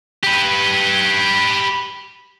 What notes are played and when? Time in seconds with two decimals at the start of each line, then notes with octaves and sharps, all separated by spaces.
0.24 G4 B4